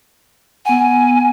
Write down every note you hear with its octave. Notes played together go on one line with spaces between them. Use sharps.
B3 F#5 G#5